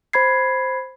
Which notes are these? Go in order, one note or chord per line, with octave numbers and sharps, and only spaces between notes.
C5 B5 G#6 C7